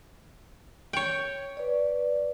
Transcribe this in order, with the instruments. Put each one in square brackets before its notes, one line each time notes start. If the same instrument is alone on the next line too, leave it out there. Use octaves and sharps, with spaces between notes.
[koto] C#5 G5
[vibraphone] B4 D5